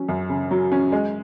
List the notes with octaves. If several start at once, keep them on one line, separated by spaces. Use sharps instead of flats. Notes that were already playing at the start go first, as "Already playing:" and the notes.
Already playing: F#3 C#4
F#2
C#3
F#3
C#4
G#3